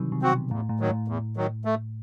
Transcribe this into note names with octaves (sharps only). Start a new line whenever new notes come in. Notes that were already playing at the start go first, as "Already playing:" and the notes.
Already playing: C3 D#3 E3 F#3 G3
C3
C4 F#4
B2
E2 A2
A2
D#3 F#3
A2
E2
D#3 F#3
A3